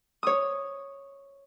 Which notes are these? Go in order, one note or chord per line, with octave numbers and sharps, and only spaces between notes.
C#5 D#6